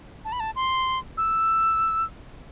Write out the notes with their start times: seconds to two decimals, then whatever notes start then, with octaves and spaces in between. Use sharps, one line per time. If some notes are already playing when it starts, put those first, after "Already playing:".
0.25 A5
0.32 B5
0.40 A5
0.56 C6
1.17 E6